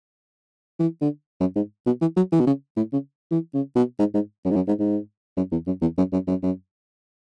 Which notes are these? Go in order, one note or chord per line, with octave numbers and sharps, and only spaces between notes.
E3
D3
F#2
G#2
B2
E3
F#3
E3
B2
C#3
A2
C#3
E3
C#3
B2
G#2
G#2
F#2
G#2
F#2
G#2
G#2
F#2
E2
F#2
E2
F#2
F#2
F#2
F#2